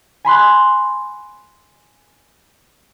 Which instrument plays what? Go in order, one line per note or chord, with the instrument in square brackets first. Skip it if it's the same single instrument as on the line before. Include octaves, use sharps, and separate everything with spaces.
[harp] G#5 B5 C6 F#6